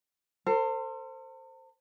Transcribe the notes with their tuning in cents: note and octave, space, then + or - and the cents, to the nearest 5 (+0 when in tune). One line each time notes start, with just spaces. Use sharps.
A4 +45 C5 +0